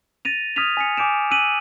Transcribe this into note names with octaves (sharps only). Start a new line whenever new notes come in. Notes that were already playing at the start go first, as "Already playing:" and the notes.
A6 A#6 D#7 F7
D#6 F6 G#6 B6 D#7 F7
G#5 B6 C#7
G#5 D6 G6 D7 E7
E6 F#6 B6 D#7 F#7